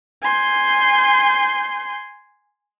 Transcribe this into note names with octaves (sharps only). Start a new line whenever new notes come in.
G#5 C6 G6